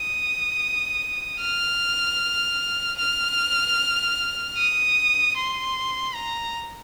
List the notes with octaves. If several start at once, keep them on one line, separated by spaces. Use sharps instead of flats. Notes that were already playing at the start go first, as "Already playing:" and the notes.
Already playing: D#6
F6
F6
D#6
C6
A#5